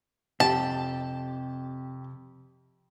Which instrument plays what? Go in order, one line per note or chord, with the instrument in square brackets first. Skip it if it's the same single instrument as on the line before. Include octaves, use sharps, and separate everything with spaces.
[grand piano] F2 [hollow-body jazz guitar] C3 [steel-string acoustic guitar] G4 [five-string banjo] A5